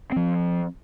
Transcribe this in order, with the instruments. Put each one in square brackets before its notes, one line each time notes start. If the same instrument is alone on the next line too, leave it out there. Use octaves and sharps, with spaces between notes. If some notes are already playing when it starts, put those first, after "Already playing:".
[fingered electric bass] F3 C4